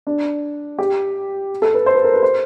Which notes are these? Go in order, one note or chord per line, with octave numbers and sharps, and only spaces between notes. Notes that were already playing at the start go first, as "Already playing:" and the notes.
D4
G4
A4
B4
C5
B4
A#4
B4
C5